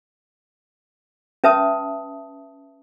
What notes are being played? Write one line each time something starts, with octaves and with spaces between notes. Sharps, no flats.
C#4 B4 E5 A5 D#6